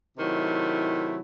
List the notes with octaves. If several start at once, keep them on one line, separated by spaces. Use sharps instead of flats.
C3 D#3 F#3 A3 E4